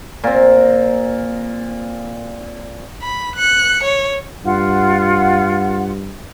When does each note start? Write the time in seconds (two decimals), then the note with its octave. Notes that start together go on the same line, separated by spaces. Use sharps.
0.24 A#2 C4
3.02 B5
3.36 F#6 C#7
3.84 C#5
4.45 G2 F4 F#5